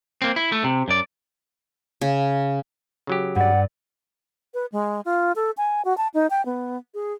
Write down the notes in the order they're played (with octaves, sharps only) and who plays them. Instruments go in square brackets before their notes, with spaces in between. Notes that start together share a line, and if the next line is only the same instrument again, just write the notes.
[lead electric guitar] A#3 C4
E4
A3
C3
F#2 D5
[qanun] C#3
[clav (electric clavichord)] C#3 F#3 G4
[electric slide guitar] G2 D5 [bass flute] F#5
[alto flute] B4
G#3
F4
A4
G#5
F#4
A5
D#4
G5
B3
G#4